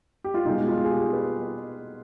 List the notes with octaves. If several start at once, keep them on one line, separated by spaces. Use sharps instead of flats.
G4
F4
B2 G#3 D#4
F4
G#4
G4
B4